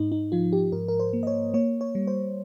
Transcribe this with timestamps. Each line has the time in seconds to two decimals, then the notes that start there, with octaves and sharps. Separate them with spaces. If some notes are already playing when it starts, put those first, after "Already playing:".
Already playing: G#2 D#4
0.12 D#4
0.32 F3 F4
0.53 G4
0.72 G#2 A#4
0.88 A#4
1.00 C5
1.13 A#3
1.23 D#5
1.27 C#5
1.54 A#3 C#5
1.81 C#5
1.95 G3
2.07 C5